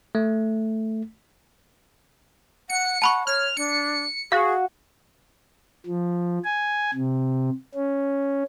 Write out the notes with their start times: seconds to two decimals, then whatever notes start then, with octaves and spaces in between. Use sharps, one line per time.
0.15 A3
2.69 F#5 C#7
3.02 F#5 A5 B5 C#6
3.27 C#5 F6
3.57 D4 C#7
4.32 F#4 G#4 F5
5.86 F3
6.45 G#5
6.94 C3
7.75 C#4